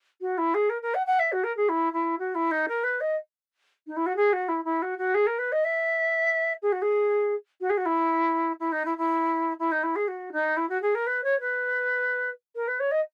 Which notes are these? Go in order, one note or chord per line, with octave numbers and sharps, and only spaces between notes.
F#4
E4
G#4
A#4
A#4
F#5
F#5
E5
F#4
A#4
G#4
E4
E4
F#4
E4
D#4
A#4
B4
D#5
D#4
E4
F#4
G#4
F#4
E4
E4
F#4
F#4
G#4
A#4
B4
D#5
E5
G#4
F#4
G#4
F#4
G#4
F#4
E4
E4
D#4
E4
E4
E4
D#4
E4
G#4
F#4
D#4
E4
F#4
G#4
A#4
B4
C#5
B4
A#4
B4
C#5
D#5